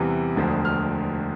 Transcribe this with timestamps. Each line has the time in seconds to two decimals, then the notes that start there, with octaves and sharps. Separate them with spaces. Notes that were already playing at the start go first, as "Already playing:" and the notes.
Already playing: E2 C3 E3 G3
0.36 E1 D2 D3 F3
0.65 F6